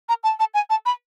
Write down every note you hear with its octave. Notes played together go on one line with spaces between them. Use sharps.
A#5
A5
A5
G#5
A5
B5